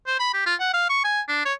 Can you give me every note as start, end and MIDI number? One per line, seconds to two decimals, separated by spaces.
0.07 0.15 72
0.19 0.29 83
0.34 0.42 67
0.46 0.55 65
0.60 0.70 78
0.74 0.88 77
0.90 1.02 85
1.04 1.21 80
1.28 1.43 62
1.45 1.54 73